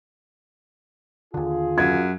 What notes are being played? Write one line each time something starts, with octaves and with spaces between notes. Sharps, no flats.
D#2 D3 F4 G#4
F#2 G#6